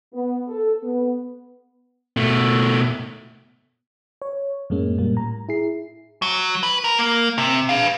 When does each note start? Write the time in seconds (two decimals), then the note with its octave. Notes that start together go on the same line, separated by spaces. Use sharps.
0.14 B3
0.48 A4
0.83 B3
2.17 B2 A3
4.22 C#5
4.70 F#2 A2 G#3 A#3 C#4
4.98 A#2 G3 A#3
5.14 A2 A#5
5.49 E4 G#4 C7
6.22 F#3
6.63 B4
6.84 A#4
6.98 A#3
7.38 C3
7.69 B4 F5